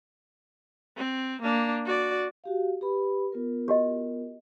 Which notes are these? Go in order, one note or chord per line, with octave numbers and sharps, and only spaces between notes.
C4
A#3 D4
F#4 D5
F#4 G4 F5
G4 B4 B5
B3 F4 A#4
F#4 G4 D#5